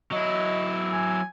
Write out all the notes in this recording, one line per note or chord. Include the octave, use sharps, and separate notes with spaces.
F#3 E4 D#5
G#5